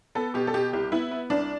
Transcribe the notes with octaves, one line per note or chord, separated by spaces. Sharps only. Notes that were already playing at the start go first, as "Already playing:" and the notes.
B3 A4
B2 G4
A4
B2 G4
C2 G4
B3 E4
B3
C2 D4